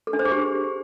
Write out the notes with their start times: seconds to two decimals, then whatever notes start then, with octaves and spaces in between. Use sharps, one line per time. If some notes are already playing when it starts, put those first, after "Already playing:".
0.07 A4
0.13 D4
0.19 C5
0.25 G#4
0.31 G4